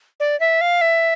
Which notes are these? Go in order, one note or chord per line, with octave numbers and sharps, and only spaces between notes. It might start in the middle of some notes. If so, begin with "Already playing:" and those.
D5
E5
F5
E5